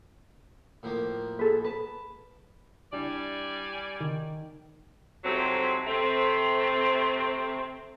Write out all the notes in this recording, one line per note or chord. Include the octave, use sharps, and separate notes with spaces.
A2 F3 A#3
G#4 A4 B4
B4 A5
G3 D4 E4 D5 G#5
D#3
F2 G#2 C3 F#3 A3 C4
C3 A3 C4